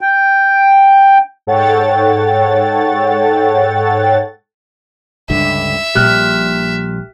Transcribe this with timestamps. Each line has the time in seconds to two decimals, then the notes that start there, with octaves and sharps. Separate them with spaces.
0.01 G5
1.47 G#2 A4 C#5 F#5 G5 A6
5.30 C#2 G2 D3 E5
5.95 A#1 A#2 G3 G4 F6 F#6